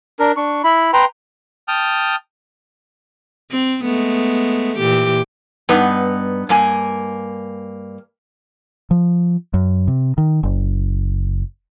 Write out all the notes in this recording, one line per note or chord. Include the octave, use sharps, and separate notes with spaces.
D4 A#4
D4 C#6
E4 B5
B4 G5 A#5 C6
G5 A5 D#6 F6
C4
G#3 A3 B3
A#2 E3 G4
G2 B3 D#4
G2 A#3 G#5
F3
F#2
C3
D#3
F#1